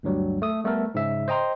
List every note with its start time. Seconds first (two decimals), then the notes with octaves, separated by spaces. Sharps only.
0.03 D2 G2 F#3 G3
0.42 A3 D#6
0.64 G3 A3 B3 A4 A#4
0.94 G#2 C#3 E5
1.28 C5 D#5 G5 A#5 C6